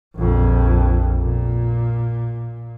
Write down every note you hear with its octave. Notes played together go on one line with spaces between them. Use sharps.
A#1 F2
A#2